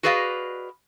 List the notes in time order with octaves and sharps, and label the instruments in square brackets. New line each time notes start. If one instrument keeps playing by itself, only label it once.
[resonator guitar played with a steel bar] F#4 G#4 B4 D5 D#5 F5